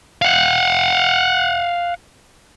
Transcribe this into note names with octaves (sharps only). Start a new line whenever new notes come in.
F5 F#5